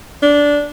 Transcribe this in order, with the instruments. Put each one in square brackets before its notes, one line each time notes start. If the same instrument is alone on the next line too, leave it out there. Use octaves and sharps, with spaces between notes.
[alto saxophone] D4